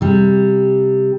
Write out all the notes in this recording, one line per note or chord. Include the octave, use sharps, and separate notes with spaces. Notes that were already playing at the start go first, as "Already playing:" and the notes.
C3 G3